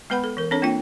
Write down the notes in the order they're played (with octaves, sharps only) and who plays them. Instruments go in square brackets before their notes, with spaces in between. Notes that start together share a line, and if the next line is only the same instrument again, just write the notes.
[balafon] G#3 B3 B4 F#5 B5
A4
E3 A#4
C4 D4 A4 C#5
A#3 C4 D4 F4 G5